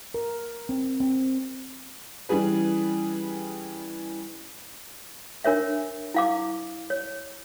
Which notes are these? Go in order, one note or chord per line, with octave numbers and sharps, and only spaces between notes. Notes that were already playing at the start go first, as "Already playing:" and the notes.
A#4
C4
C4
E3 G3 C#4 G#4 B4
D4 A#4 C#5 E5
E4 F5 D6
C#5